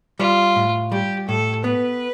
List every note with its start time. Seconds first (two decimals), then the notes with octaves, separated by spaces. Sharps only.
0.19 G3 F4
0.56 A2
0.92 G3 G4
1.28 A2 A4
1.64 B3 B4